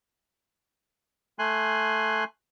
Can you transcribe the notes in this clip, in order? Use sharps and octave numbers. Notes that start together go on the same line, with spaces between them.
A3 G#5 C6 F#6